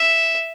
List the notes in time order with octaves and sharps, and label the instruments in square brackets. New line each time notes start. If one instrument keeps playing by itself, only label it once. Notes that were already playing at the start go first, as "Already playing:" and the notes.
Already playing: [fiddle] E5